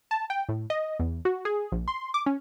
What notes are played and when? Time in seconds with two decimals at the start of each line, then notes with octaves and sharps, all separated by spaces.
0.11 A5
0.30 G5
0.49 A2
0.70 D#5
1.00 E2
1.25 F#4
1.45 G#4
1.72 A#1
1.88 C6
2.14 D6
2.26 C#4